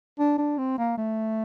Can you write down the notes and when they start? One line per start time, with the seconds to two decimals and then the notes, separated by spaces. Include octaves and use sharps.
0.19 D4
0.38 D4
0.58 C4
0.78 A#3
0.98 A3